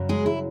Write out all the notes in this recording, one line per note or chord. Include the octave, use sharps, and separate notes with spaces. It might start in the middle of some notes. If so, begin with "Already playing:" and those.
Already playing: F#2 C#3 F#3
G#3 G#4
E4